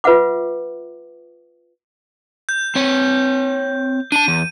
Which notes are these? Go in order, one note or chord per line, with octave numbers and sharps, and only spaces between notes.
F4 B4 E5 F#5 D6
G6
C4 C#5
D4 A5 D#7
E2